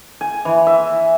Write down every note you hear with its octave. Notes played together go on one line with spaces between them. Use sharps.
G#5
E3
E5